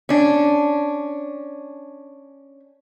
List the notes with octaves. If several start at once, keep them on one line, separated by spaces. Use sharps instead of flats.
C#4 D4